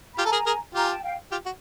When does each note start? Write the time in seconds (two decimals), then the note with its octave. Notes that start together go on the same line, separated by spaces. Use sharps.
0.14 B5
0.18 F4 G4 G#5 A#5
0.26 A4
0.32 G#4 A#4
0.47 G#4 A#4
0.75 F4 G4 G#5 A#5
0.90 G5 A5
1.03 F5 G5
1.31 F4 G4
1.46 F#4